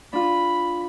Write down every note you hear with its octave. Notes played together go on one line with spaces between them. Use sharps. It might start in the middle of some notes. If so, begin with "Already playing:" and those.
D4 F4 B5